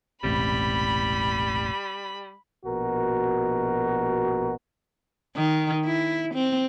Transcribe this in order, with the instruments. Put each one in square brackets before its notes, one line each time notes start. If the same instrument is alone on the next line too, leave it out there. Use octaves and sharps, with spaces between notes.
[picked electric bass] E1 A1 C3 [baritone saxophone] G3 [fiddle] B5
[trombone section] A#1 B2 F#4 A#4
[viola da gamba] D#3
E4
C4